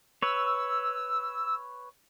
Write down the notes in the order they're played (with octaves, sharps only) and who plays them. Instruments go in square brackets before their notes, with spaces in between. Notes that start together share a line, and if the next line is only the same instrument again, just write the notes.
[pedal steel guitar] B4 C#5 [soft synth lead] E6